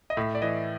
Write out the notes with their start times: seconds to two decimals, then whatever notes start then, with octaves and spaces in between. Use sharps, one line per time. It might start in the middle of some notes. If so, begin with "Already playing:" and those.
0.10 D#5
0.17 A2 E5
0.35 D5
0.42 E3 D#5